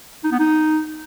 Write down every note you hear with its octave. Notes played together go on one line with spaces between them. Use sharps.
D#4
B3
D#4